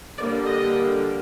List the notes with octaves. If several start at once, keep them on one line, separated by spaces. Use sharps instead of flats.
D3 G3 A#3 D5
D#5